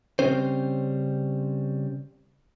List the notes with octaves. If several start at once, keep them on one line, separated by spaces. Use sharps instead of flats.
C#3 E3 G3 C4 C#4 C5